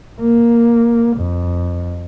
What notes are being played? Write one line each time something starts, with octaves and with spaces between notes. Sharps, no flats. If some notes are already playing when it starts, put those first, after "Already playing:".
A#3
F2